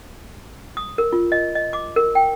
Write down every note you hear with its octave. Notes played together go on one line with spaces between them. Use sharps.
D#6
A#4
F4
D#5
D#5
D6
A#4
G5